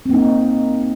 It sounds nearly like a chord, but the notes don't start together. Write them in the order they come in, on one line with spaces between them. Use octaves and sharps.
C4 A#3 D#4